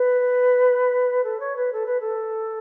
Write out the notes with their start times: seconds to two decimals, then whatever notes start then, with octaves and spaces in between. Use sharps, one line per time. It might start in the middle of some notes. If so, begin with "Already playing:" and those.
Already playing: B4
1.24 A4
1.40 C#5
1.56 B4
1.73 A4
1.86 B4
2.00 A4